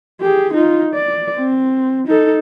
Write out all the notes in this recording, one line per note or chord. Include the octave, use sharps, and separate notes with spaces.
G4 G#4
D#4 F4
D5
C4
D#4 A4